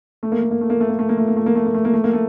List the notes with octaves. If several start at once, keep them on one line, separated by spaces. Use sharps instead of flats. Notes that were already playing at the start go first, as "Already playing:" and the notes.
A3
A#3
A3
A#3
A3
A#3
A3
A#3
A3
A#3
A3
A#3
A3
A#3
A3
A#3
A3
A#3
A3
A#3
A3